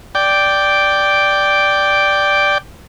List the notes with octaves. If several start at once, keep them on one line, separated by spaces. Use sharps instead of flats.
D5 G5